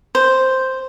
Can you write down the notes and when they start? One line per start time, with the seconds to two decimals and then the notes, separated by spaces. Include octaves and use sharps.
0.15 C5